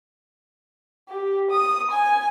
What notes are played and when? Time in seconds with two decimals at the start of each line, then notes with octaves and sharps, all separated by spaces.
1.08 G4
1.50 D#6
1.90 G#5